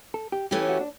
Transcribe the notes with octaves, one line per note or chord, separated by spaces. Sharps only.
A4
G4
E3 A3 C#4 E4 G4
F#4
D4